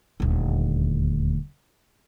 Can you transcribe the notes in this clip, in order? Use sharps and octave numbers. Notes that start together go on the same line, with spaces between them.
D#1 D2